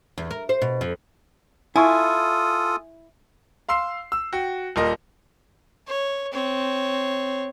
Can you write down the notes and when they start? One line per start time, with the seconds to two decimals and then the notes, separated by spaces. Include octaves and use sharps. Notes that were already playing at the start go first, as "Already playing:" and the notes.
0.18 E2
0.31 A#4
0.49 C5
0.62 B2
0.81 F2
1.76 E4 F4 A4 G#5 C6 C#6 D#6
3.69 F5 C6 E6 C7
4.12 E6
4.33 F#4 G5
4.76 D#1 A#2 A#4 D#5
5.87 C#5
6.33 C4 C#5